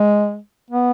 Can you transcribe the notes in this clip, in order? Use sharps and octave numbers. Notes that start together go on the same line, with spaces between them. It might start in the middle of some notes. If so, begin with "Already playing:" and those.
Already playing: G#3
B3